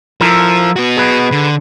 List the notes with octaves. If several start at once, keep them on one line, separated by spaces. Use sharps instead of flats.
F3 E4 A4 A#4
B3 F#4
G#4 B4
D3